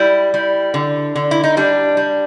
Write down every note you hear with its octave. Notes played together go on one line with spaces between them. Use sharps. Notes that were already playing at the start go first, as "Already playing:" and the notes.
Already playing: G3 E4
G3
D3
D3
E4
D#4
G3 D4
G3